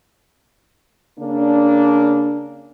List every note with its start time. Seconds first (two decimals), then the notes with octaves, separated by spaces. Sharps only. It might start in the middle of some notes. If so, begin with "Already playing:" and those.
1.20 C#3 A#3 D4